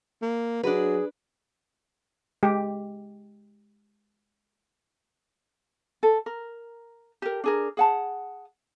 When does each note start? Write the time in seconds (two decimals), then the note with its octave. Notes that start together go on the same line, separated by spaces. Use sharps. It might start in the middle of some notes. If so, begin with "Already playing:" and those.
0.22 A#3
0.63 F#3 D4 G#4 B4
2.43 G#3 G4
6.03 A4
6.26 A#4
7.22 G4 A#4
7.44 D4 G#4 A#4
7.77 G#4 F#5 A5